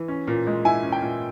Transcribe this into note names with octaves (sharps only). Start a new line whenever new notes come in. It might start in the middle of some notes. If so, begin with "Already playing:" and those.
Already playing: E3
C#4
A#2
G#3
E4 G#5
C#4
G5
A#2